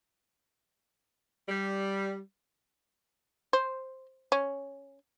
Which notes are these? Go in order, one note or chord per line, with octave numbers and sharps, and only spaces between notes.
G3
C5
C#4